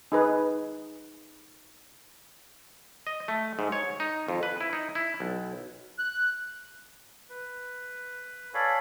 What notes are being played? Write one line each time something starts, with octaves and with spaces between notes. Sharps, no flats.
D#4 G#4 B4
D#5
A3
G#2
C#5
D#4
F2
B4
E4
D#4
E4
B1
F#6
B4
A4 C#5 D5 F5 G#5 B5